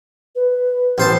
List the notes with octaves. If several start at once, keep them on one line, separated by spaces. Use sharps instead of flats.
B4
A1 C5 A5